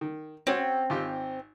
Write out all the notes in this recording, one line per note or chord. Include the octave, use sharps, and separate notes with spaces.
D#3
C4 C#4 F#4 C#5
G#1 F4 G4